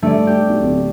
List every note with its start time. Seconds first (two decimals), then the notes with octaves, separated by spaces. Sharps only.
0.02 G2 A3 D5
0.27 G4
0.48 B1
0.61 D1